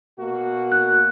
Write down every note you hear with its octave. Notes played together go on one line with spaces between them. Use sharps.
B2 A#3 F#4
F#6